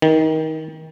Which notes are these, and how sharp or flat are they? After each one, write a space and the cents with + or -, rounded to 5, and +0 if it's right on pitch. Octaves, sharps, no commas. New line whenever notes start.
D#3 +25